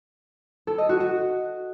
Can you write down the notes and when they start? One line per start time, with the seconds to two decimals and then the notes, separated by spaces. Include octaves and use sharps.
0.67 A4
0.78 D#5
0.89 F#4
1.00 F#4